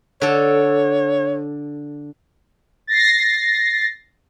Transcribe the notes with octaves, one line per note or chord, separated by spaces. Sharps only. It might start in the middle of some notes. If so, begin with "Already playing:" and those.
D3 A4 C#5
A6 A#6 C7